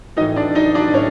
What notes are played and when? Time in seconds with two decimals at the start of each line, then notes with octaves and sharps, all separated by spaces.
0.17 E3 D#4 D#5
0.20 A2
0.36 D4 D5
0.55 D#4 D#5
0.75 D4 D5
0.93 A2 C#4 C#5